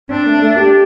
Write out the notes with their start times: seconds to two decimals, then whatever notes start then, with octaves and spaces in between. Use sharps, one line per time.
0.10 C4 D4
0.26 A3
0.42 A3
0.57 G4